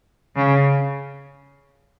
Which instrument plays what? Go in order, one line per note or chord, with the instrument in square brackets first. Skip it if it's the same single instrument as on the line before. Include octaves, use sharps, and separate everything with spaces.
[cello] C#3